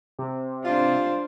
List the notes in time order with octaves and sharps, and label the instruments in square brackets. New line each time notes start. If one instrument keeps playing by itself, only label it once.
[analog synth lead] C3
[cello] D4 C5 [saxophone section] F4